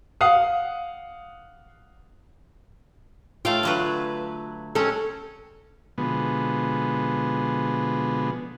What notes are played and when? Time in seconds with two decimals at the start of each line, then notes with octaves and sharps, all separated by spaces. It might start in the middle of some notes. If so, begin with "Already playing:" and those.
0.21 F5 F#5 D#6
3.45 A3 F4 F5 G5
3.63 D3 F#3 B4
4.75 G#3 C4 C#4 A4
5.98 B2 D3 F3 G#3 B3